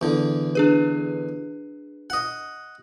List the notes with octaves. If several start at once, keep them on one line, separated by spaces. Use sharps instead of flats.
E2 D3
D4 G#4 B4
D#5 F#5